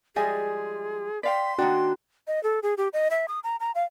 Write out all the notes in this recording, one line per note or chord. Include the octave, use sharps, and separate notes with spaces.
F3 G3 G#3 G#4 D#5 E5 G#5
D5 F5 G5 C6 B6
D#3 A#3 D4 F#4 G5
D#5
A4
G#4
G4
D#5
E5
D#6
A#5
A#5
F5